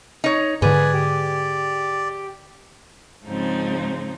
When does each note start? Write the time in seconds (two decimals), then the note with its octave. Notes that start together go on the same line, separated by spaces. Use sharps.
0.24 D#4 C#5
0.62 G#2 D3 G#4 B4 D5 G#5
0.93 G4
3.26 G#2 C#3 F3 G#3 C4 D#4